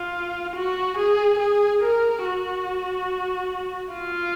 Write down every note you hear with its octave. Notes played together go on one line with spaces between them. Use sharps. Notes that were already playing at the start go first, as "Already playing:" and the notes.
Already playing: F4
F#4
G#4
G#4
A#4
F#4
F4